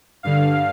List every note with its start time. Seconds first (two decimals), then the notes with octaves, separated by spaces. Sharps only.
0.23 G2 D3 F5